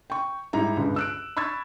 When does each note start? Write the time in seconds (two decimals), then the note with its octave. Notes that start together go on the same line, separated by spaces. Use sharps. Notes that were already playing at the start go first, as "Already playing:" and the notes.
0.10 G5 C#6
0.53 G#2 G3 E4 A#5
0.77 C#2 G2 D3
0.96 E6 F#6 D7
1.37 B5 C#6 E6 G#6 A6